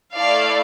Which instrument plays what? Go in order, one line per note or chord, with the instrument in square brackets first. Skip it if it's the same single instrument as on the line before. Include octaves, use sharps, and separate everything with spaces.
[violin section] A3 E4 A4 D5 F5